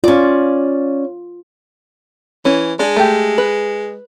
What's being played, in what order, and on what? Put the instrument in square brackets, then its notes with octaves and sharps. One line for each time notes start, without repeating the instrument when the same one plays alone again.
[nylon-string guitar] C#4 D5 [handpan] F4
[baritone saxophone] E3 [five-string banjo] C#4
[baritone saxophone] G#3 [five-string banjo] D4 G#4
[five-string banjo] A3 G4
B4